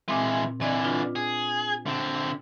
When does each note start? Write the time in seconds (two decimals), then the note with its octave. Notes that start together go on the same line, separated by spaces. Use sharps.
0.08 A#2 E3 G#3 C4
0.61 D3 E3 C4 D5 D#5
0.84 D4 F4 B4
1.16 G#4
1.86 D3 C4